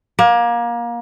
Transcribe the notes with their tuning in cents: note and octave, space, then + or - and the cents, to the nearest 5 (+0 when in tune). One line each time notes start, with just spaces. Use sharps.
A#3 +25